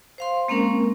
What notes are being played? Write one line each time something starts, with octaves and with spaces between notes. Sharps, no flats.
C5 F5 C6
G#3 A#3 C4 C#4 A#4